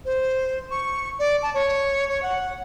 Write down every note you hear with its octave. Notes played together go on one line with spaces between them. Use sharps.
C5
C#6
D5
A5
C#5
C#5
F#5